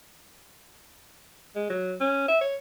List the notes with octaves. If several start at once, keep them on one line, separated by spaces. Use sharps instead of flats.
G#3
F#3
C#4
E5
C#5